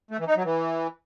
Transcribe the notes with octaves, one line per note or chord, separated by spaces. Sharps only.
A3
E3
D#4
F#3
E3